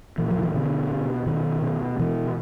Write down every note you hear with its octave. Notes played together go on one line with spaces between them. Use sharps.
A#2 E3
F3
D#3
E3
B2 D3
B2
B2 D#3
B2
B2 E3